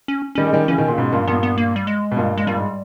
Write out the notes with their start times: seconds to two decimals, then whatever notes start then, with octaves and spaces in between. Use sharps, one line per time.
0.08 C#4
0.35 D#3 G3 C#4
0.47 G#3
0.53 D#3 G3
0.68 C#3 E3 C#4
0.78 B2 D#3
0.88 A#2 C#3
0.98 G#2 B2
1.12 G2 A#2
1.27 G2 A#2 B3
1.43 B3
1.58 A#3
1.76 G3
1.87 G#3
2.12 B2
2.17 G2 A#2
2.37 G#3
2.47 G2 A#2 G3
2.57 G#2